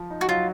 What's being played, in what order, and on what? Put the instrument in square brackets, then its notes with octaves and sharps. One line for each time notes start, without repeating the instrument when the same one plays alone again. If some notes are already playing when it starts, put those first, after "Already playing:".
Already playing: [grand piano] F3
D#4
[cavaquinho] F#4
[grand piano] F#3 [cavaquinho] F4